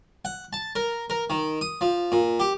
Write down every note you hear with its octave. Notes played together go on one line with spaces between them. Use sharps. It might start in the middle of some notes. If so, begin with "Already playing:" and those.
F#5
A5
A#4
A#4
D#3
D#6
F3
A#2
G4